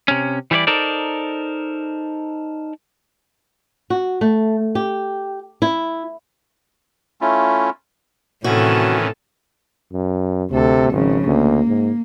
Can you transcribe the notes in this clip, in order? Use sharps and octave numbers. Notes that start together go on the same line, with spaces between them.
C3 C#4
E3 G3 E4 C#5 D5
D#4 A4 A#4 C5 D5
F#4
A3
G4
E4
A3 C#4 E4 F4
A2 C3 D#3 E3 C#4 F#4 A4
F#2
D2 C3 A4
G#1 C#3 F3
D2 A#3
G#2